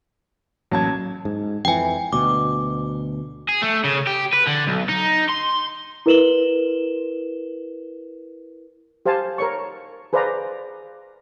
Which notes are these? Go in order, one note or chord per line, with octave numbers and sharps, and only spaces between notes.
A1 F#3 A#3 A5 G#6
G#2
F2 E3 G5 G#5
D2 B2 D6
G#4
A3
C#3
G4
B4
D3
B1
D#4
C6
E4 A#4 B4 E7 F#7 G7
G4 C5 F5 G#5 A5
A#4 C#5 C#6
G#4 B4 C5 D5 F5 A#5